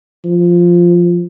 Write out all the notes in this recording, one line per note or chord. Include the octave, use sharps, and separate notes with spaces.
F3